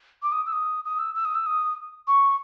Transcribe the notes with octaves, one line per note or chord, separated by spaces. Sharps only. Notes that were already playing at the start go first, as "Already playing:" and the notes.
D6
D#6
E6
D#6
D#6
E6
E6
D#6
E6
D#6
C#6